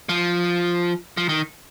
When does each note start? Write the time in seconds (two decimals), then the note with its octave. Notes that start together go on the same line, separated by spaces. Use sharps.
0.09 F3
1.17 F3
1.29 D#3